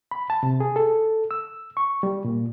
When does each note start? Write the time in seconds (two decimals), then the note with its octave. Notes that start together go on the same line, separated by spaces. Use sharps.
0.11 B5
0.30 A5
0.43 C3
0.60 G#4
0.76 A4
1.31 E6
1.77 C#6
2.03 G3
2.25 A#2